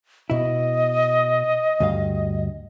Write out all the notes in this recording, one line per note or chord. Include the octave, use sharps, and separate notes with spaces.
B2 E4 D#5
D2 G2 F5